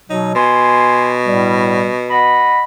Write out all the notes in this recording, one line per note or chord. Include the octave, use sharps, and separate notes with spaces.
B2 F#3 D#4
B2 G#5 C6
A2 G3
D#5 F#5 B5